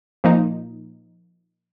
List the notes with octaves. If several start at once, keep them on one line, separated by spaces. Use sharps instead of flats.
A#2 F3 A#3 D#4